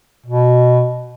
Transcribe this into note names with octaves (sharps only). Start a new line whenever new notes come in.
B2